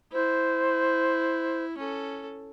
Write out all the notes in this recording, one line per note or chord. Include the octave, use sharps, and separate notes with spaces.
E4 C5
C#4 A4